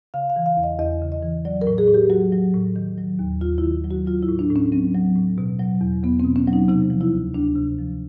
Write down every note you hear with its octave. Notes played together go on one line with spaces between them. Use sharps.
C#3 F5
F5
E3
F5
E2
D#5
E2 D#5
C#3
D#5
E3
F#3 D5
A#4
A2
G#4
A2
G4
F#3 F#4
F#3
A2
D#3
F#3
D#2
D#2 F4
E4
D#3
F#3
F#4
F#3 F4
E4
A2
D4
A2
C#4
F#3 C4
F#3
A2
B2
F#3
E2
E2 B3
C4
B2
C#4
F#3
D#4
C3 D#4
F3
E4
D2
D2 D4
C3
F3